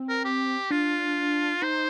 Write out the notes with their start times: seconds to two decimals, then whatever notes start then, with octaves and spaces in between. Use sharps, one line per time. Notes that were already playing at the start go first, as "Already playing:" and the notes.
Already playing: C4
0.09 A#4
0.25 G4
0.70 D4 F4
1.62 D#4 C5